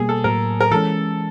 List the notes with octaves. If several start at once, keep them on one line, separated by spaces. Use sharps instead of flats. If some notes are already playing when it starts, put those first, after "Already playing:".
Already playing: B2 G3 A#3 G#4
A4
A2 F#3 A#3 A#4
A#4
E3 G#3 C#4 A4